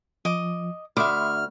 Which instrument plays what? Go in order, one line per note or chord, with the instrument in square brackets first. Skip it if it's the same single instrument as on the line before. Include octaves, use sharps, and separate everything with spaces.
[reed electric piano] F3 [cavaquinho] D#5 D6
[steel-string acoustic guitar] D2 [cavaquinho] E5 D6 [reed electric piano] B5 C6 D#6 [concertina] F6